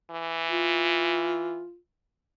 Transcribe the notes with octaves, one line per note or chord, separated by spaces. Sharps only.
E3
F4